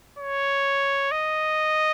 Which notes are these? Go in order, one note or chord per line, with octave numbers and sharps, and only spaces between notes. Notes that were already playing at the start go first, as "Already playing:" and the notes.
C#5
D#5